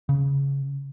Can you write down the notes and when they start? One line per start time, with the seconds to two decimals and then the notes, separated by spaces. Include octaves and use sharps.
0.09 C#3